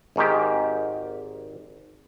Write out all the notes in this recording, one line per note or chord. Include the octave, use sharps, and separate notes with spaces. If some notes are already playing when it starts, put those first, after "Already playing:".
G#1 G#2 D#3 G4